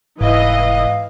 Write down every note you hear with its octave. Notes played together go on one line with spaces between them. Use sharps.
F1 G#2 E3 D#5 F5